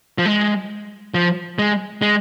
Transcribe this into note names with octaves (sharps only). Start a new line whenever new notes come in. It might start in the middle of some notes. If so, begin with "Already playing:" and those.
F3
G#3
F3
G#3
G#3